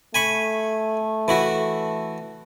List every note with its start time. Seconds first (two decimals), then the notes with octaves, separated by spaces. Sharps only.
0.15 A3 G#5 B5 C#6
1.28 E3 E4 F#4